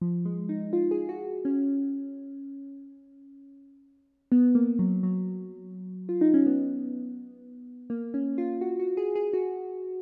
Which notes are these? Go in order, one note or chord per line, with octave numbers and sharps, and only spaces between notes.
F3
G#3
D#4
F4
G#4
F#4
C#4
B3
A#3
F#3
F#3
F4
D#4
C#4
B3
A#3
C#4
F4
F#4
F#4
G#4
G#4
F#4